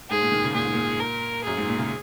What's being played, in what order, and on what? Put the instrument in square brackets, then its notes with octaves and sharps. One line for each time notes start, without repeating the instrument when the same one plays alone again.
[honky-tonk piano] G#2 [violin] G#4
[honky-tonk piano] A#2
D#3
C#3
[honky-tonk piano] A#2 [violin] G#4
[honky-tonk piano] G#2
A#2
[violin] A#4
[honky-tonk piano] F#2 [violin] G#4
[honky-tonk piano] G#2
A#2
C#3